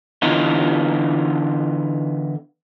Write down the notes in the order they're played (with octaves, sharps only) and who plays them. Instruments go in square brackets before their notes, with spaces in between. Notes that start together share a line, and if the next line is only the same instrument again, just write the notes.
[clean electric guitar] D3 E3 B3 D#4 F4